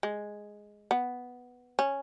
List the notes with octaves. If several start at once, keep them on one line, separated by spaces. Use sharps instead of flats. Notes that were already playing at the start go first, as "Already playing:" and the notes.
G#3
B3
C#4